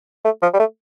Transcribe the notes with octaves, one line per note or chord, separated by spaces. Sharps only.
A3
F3
G3
A3